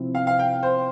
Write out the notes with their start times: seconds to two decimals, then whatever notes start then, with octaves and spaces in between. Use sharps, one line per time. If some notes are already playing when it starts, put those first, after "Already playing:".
Already playing: C3 F3 C4 E4
0.15 F5
0.27 F5
0.39 G5
0.63 C5